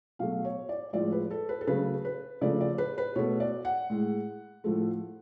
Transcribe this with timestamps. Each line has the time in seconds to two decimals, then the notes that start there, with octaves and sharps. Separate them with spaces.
0.19 B2 F#3 A3 F5
0.45 C#5
0.69 D5
0.93 A2 F3 G#3 D5
1.12 B4
1.30 A4
1.49 B4
1.61 A4
1.67 C#3 F#3 A3 B4
2.05 B4
2.41 C#3 F3 A3 D5
2.61 D5
2.78 B4
2.98 B4
3.16 B2 A3 C#5
3.40 D5
3.65 F#5
3.90 A2 G#3
4.64 A2 F3 A3